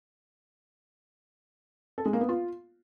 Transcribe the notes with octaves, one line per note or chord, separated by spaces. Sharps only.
A4
G#3
A#3
B3
F4